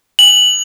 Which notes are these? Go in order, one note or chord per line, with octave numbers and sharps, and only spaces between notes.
F#7